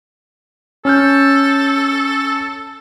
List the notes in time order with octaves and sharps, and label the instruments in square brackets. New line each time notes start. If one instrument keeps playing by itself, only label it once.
[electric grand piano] C#4 F6 G6 [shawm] A4